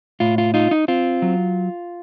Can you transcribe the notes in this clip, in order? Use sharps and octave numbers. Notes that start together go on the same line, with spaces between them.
A2 F4
F4
D#4 F4
D#4
C4 F4
F#3